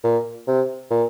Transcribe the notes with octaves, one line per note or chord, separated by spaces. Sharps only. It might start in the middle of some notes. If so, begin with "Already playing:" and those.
A#2
C3
A#2